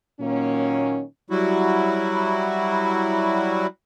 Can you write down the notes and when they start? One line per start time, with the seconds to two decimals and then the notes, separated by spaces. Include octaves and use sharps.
0.20 A#2 D#3 F#3 A#3 C#4
1.30 F#3 G3 E4 F#4